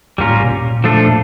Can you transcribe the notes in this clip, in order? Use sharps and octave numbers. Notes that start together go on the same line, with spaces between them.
G#2 G3 A#3 C#4 F4 A#4
A2
B2
A#2
F3 A3 D4 F4 A4
A#2